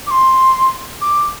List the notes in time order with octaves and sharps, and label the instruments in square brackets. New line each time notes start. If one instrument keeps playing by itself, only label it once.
[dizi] D6
C6
D6